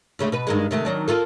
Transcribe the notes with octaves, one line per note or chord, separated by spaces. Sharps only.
D2 C#3 A3
B2 B4
G2 D#3 G#3
C3 D#3 A3
D#3 F#3 D4
A#3 F4 A4